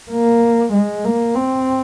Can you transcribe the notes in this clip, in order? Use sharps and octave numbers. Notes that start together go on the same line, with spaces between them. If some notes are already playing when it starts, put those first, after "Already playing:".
A#3
G#3
A#3
C4